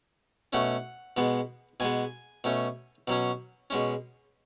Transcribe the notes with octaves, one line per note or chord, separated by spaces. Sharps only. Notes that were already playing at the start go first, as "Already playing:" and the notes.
B2 A3 C#4 F#5
B2 G#3 B3
B2 G#3 B3 G#5
B2 A3 C#4
B2 F#3 C#4
B2 G#3 C#4